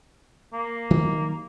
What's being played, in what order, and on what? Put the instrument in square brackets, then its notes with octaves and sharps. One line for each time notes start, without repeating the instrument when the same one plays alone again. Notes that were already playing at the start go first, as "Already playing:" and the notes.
[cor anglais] A#3
[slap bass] D#3 F#3 G3